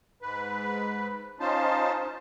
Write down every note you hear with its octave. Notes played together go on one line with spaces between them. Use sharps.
G#2 B4
C#4 D#4 F4 C5 A5